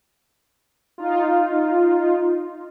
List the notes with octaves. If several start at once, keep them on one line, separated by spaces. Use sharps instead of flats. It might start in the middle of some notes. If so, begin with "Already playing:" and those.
D#4 F4